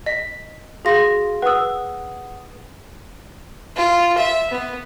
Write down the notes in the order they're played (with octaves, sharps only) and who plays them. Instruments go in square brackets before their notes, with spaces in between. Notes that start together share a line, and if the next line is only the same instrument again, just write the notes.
[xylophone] D#5 B6
[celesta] F#4 F5 C6 [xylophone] G#4 A#6
[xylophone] B4 E6 [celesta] F#5 D#6
[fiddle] F4
E5
B3